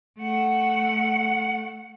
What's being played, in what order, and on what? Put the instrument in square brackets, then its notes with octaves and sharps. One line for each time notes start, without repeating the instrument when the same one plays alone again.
[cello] A3 F#5